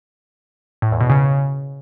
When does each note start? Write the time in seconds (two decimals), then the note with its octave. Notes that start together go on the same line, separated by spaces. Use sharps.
0.82 A2
0.91 E2
1.01 B2
1.10 C#3